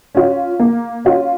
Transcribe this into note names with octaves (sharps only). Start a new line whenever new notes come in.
C#4 F4
A#3
C#4 F4